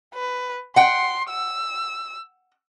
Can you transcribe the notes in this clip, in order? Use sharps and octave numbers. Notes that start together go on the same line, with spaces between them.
B4
F#5 G5 C6
E6